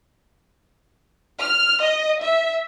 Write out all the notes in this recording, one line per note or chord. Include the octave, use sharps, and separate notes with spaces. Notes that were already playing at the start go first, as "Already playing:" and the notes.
F6
D#5
E5